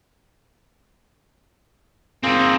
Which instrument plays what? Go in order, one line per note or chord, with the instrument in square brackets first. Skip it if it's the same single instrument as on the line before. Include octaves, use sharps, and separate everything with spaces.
[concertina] A#3 F4 G#4 [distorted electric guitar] C4 D#4